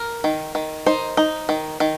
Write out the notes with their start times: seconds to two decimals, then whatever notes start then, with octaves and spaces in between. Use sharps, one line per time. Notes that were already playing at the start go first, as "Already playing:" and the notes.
Already playing: A#4
0.24 D#3
0.55 D#3
0.86 D#4 C5
1.17 D#4
1.49 D#3
1.80 D#3